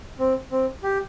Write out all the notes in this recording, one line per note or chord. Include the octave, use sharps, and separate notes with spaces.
C4
C4
G4